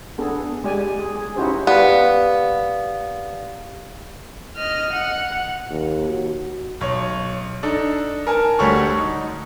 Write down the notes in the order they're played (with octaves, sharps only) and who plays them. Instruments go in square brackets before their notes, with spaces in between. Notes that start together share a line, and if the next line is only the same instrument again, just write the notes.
[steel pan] B3 D4 G#4 A4
G#3 G4 D5 G#5
G#4
G#4
C#4 D#4 E4 F#4 G4 C5
[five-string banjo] B3 [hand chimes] G4 D5 F5
[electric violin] D#5 F6
F#5
[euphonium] D#2
F#4
[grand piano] B1 C#5
D4 D#4 A4
A#4 G#5 A5
D2 G3 F#4 A4 C#5 C#6
D#4